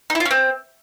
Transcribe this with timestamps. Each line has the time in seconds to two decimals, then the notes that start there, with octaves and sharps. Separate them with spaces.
0.10 D#4
0.15 E4
0.20 F4
0.25 C#4
0.31 C4